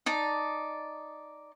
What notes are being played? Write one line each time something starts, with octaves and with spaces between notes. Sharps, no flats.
D#4 D5 A5